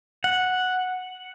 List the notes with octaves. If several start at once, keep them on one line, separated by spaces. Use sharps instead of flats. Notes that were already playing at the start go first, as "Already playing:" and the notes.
F#5